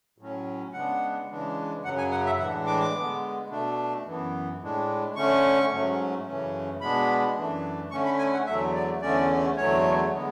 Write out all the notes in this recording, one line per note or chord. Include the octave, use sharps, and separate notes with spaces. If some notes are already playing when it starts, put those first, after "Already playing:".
A2 F#3 C#4
C#3 G#3 B3 D4 F#5
C#3 E3 G#3 D4
F#2 C#3 F#3 F#5
G#5
F#5
E5
A2 E3 G#3 D4 F#5
D6
D3 G#3 B3
B2 A3 D4
F#2 E3 B3
A2 G#3 D4
D3 A3 C#4 C#6
G#2 F#3 A3 C#4
F#2 C#3 E3 A3 C#4
B2 G#3 B3 D4 B5
F#2 E3 A3 D4
D3 A3 C#4 C#6
B5
G#5
F#5
E2 D3 F#3 A3 E5
D5
E2 D3 A3 C#4 D5
E2 D3 F#3 A3 C#5
D3 G#3 B3